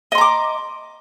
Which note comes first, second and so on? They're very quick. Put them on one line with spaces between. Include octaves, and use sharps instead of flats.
D#5 C6 A#5 D6